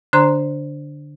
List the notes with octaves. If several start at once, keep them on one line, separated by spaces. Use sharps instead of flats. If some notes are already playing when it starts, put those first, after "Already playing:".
D3 D4 C5 A#5 C6